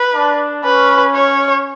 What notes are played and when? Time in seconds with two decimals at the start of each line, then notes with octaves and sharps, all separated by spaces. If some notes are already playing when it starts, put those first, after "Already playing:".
Already playing: B4
0.14 D4
0.64 C#4 B4
1.15 C#5